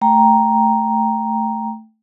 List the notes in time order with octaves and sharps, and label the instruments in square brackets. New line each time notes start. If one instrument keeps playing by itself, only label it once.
[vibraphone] A3 G5 A#5